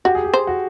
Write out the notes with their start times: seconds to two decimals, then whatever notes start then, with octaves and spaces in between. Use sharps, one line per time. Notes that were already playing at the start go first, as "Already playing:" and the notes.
0.05 F#4 G4
0.15 G#4
0.24 G4
0.34 C5
0.47 F#4